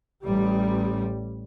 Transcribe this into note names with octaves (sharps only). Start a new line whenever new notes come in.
A1 G3